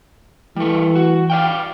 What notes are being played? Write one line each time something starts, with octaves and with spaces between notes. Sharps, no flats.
E3 G3 A3
F#4
D5 F5 G5